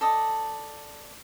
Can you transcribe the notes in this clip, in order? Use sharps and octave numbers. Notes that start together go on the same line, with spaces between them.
A4 D5 D#5